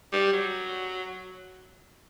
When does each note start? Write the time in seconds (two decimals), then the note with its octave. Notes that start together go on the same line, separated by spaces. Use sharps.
0.13 G3
0.33 F#3